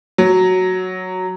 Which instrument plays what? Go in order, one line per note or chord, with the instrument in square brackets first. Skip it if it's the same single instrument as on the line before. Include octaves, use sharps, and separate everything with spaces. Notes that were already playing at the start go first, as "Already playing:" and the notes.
[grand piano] F#3